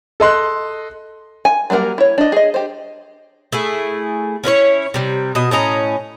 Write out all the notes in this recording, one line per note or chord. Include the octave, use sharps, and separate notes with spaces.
A4 D#5 C6 F#6
G#5
F#3 G3 A#3 A#4 F#5
E4 C#5
D4 D#5
G#4 D#5
G4 C5
A3 E4 G#4
C#4 E4 B4 C#5
C3 G3
B2 D#5
A2 C#4 D#5 A#5